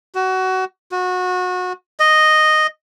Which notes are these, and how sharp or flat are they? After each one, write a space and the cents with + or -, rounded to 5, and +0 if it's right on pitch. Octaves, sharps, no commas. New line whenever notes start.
F#4 +20
F#4 -25
D#5 -5